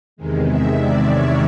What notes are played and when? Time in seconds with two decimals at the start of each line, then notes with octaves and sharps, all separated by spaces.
0.16 E2 C3 D#3 G#3
0.47 E5
0.77 D5
1.08 C#5